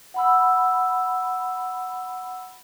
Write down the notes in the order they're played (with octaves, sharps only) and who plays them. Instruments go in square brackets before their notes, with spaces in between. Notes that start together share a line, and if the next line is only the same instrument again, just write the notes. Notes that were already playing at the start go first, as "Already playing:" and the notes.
[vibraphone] F#5 B5 E6